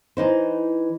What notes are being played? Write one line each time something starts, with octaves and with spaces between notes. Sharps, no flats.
E3 D#4 C5